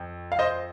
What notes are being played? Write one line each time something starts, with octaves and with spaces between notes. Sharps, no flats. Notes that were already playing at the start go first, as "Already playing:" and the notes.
Already playing: F2
F5
C5 D#5